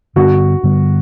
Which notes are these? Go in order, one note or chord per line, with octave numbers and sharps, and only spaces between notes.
G2 D3 G3 B3 F#4
G2 D3 G3 B3